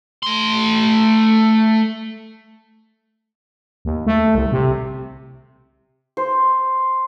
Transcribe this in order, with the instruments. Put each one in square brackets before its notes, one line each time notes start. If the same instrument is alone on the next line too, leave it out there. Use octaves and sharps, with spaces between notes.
[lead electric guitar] A3 C6
[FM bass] D#2
A3
C2
C3
[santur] C5